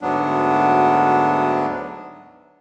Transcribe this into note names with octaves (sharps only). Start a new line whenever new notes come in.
D2 G#2 F#3 B3 D4